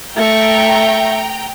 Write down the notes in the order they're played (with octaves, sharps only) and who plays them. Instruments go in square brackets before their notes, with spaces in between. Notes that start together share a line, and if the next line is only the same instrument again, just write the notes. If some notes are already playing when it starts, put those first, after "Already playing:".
[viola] A3 C#6 [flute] E5 [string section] G5 A#5